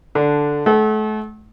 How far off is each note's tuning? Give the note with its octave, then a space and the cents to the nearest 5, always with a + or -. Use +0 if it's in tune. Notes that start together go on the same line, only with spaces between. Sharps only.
D3 +0 D4 -5
A3 -35 A4 -30 F#5 +30